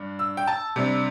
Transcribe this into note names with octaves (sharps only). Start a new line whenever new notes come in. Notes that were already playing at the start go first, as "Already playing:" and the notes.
Already playing: G2 D4
E6
G5
A5
C3 G3 D4